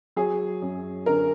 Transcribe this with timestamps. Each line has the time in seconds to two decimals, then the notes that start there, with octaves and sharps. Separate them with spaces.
0.16 F#3 G#4
0.62 F#2
1.06 D3 A#4